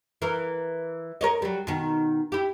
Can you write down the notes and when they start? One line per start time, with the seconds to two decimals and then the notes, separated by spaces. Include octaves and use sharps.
0.22 E3 A#4
1.21 A#4 C#5 D#5
1.42 F#3 G3
1.67 B2 D#3
2.32 E4 G4